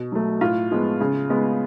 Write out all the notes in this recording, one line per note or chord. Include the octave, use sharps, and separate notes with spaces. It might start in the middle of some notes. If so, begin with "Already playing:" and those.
Already playing: B2
F#3 A3
A2 F4
F3 G#3 B3
C#3
G#3 B3